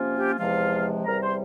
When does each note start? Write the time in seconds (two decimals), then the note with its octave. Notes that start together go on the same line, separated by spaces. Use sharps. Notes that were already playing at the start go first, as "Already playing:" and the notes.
Already playing: C3 F3 A#3 C#4 F4
0.15 G4
0.38 E2 C3 F3 G#3 F4 F5
1.05 E2 C3 G3 A#4 A#5
1.22 C5 C6